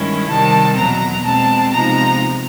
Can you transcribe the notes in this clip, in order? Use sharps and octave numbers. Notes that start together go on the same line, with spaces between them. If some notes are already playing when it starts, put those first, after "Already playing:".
Already playing: G2 D#3 G#3 C#4 E4
C3 D#3 G3 C4 A5
E2 B2 F#3 A#5
B2 G#3 C4 A5
C3 F3 G#3 B3 D#4 A#5